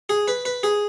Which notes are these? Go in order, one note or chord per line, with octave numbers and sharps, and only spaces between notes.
G#4
B4
B4
G#4